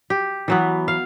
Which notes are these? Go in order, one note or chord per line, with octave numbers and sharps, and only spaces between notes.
G4
E3 F#3 B3
F5